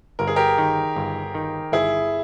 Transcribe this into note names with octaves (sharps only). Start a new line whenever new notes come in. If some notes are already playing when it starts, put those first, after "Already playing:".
G1 A#4
G#4
G4 A#4
D#3
G1
D#3
G1 E4 G#4